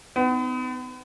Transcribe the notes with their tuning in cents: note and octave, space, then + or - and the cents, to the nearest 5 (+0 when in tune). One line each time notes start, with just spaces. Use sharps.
B3 +40 D#4 +0